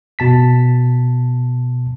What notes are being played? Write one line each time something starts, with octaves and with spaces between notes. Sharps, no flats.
B2 A5 B6